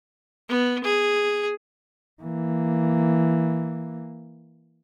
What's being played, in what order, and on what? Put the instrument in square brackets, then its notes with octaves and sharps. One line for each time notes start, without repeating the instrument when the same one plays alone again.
[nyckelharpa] B3
G#4
[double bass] E3 A#3